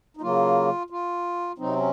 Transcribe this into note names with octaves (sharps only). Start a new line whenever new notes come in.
D#4
C#3 F#3 A#3 F4
F4
C3 F#3 C4 D#4
C#4